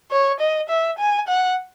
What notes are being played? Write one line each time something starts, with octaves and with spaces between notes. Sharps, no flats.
C#5
D#5
E5
G#5
F#5